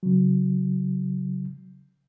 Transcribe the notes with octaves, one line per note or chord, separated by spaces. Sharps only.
C#3 F#3